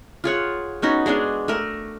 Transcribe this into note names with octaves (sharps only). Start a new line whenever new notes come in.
F4 G#4 C#5 F#5
B3 C#4 D#4 F#4
G#3 B3 D4 G#4
A3 A#4